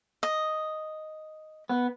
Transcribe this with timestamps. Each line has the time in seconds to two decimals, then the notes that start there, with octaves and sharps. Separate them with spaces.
0.23 D#5
1.70 B3